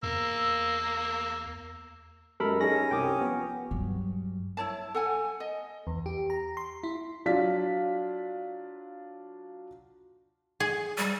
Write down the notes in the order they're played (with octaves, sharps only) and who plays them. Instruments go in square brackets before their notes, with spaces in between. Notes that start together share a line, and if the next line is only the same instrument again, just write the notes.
[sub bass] E2 [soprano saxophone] A#3 [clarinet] E6
[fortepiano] F#2 F#3 G#3 [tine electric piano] A4 A#4 B5
[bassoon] C#4 [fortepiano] D#4 G#4 A4 [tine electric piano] A#6
[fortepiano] C2 G3 [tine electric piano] G5 D6 D#6
[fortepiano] F3 [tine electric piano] B3
[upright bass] G2 F#3
[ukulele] E4 C#5 A5
A4 F#5 G#5
D#5
[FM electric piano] E2
G4
A#5
C6
E4
[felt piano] F#3 D4 F4 F5 B6
[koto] G#4
[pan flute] G3